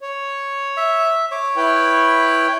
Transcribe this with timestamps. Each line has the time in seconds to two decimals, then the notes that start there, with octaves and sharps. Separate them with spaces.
0.01 C#5
0.77 E5
1.31 C#5 D6
1.57 E4 B4 G5